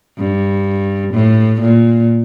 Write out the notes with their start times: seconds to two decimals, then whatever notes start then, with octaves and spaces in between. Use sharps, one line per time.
0.18 G2
1.13 A2
1.61 A#2